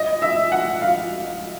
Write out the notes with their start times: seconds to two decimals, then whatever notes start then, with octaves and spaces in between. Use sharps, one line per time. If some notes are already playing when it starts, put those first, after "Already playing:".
Already playing: D#5
0.22 E5
0.52 F#5
0.81 F5